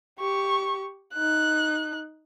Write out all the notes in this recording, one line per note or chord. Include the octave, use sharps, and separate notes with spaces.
G4 C#6
D#4 F#6